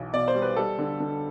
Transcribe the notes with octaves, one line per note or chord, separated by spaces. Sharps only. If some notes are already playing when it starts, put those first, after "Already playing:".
Already playing: B1 B2 E3
B2 D5
C5
G3
B4
G3 A4
D3
D3